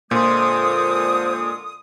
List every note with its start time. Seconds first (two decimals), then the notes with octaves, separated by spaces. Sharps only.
0.11 A#2 D3 G#3 F4 C5 C6 D#6